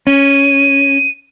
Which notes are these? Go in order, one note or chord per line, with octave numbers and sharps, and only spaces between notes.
C#4 D#7